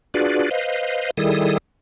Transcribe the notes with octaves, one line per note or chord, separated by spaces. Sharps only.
D4 F4 F#4 G#4 B4 D5
B4 C5 D#5 F5
D#3 G3 E4 G#4 A4 D#6